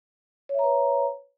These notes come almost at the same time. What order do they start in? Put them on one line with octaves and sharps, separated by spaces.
C#5 E5 A#5 B4